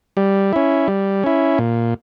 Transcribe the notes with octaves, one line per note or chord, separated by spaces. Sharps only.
G3
C#4 E4
G3
C#4 E4
A#2